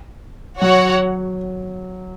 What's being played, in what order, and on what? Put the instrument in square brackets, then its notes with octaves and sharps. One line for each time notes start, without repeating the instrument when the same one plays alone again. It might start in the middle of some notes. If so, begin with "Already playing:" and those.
[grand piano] F#3 [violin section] F#4 C#5 F#5